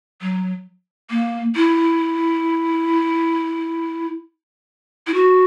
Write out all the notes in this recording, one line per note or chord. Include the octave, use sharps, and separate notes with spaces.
F#3
A#3
E4
E4
F#4